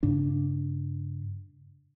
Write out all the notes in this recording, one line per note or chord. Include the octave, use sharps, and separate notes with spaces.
G2 C#3 D4